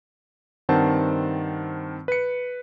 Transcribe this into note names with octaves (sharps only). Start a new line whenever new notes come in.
G2 D#3 C4 C5 F#5 A5
B4 C#7